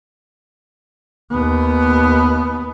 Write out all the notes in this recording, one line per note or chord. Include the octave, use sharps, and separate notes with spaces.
D#2 B3